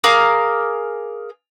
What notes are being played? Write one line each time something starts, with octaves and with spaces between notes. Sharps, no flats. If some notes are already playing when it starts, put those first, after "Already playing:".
G#4 A#4 F5 D6